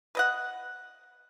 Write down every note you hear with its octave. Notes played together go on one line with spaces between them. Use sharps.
B4 D#5 F#5